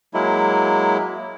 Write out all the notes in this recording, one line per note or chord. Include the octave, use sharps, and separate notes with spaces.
F#3 G#3 A#3 E4